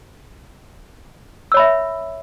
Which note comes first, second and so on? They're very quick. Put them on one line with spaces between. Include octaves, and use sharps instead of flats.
E6 C#5 B5 E5